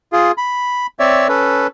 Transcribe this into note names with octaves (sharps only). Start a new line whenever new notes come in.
F4 G#4
B5
C4 C#5 D5 E5
C#4 A4 B4